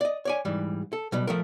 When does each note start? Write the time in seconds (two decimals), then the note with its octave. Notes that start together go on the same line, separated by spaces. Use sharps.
0.01 D5 D#5
0.25 C#5 D5 G#5
0.45 G#2 E3 G3
0.93 A4
1.12 B2 F#3 G3
1.27 F3 A3 A#4